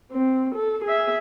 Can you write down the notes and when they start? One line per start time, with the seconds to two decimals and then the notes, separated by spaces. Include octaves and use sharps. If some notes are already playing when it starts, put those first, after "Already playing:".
0.12 C4
0.55 A4
0.84 G#4 E5